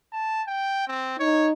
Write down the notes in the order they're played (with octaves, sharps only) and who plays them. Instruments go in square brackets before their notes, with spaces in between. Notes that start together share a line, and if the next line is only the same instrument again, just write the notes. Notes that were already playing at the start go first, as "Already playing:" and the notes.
[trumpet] A5
G5
C4
[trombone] D#4 [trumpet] C#5